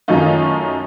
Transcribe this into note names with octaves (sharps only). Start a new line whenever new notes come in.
F#2 D#3 F#3 A3 D#4 F4